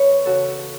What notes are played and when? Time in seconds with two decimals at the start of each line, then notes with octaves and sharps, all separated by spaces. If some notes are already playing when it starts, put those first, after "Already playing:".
Already playing: E2 B4 C#5
0.25 C#3 F#4 A4